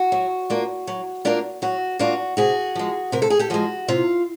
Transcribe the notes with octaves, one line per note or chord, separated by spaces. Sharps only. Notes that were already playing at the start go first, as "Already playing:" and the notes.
Already playing: F#4
F#3
A#3 D4 F4
F#3
A#3 D4 F4
F#3 F#4
A#3 D4 F4 F#4
C3 F#4 G#4
F3 G#3
C3 A#4
A4
G#4
G4 A4
F3 G#3 F#4
C3 F4